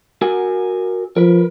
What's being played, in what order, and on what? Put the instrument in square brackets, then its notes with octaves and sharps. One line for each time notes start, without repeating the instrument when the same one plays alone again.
[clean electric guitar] F#4 A#4 G#5
[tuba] F3 [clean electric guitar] A#4 B4